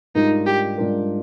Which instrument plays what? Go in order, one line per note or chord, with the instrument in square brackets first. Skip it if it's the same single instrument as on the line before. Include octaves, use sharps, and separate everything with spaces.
[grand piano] G#2 G3 D4 F4 A#4 [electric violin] D#4
[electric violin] G4
[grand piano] G#2 G3 D4 F4 A#4